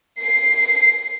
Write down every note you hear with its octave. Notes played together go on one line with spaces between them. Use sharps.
C7